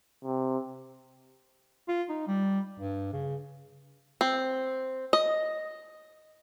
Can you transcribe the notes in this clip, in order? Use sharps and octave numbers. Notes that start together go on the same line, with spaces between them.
C3
F4
D#4
G3
G2
C#3
C4
D#5